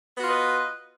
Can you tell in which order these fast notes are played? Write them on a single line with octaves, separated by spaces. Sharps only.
B3 F#4 F4 D#5 B4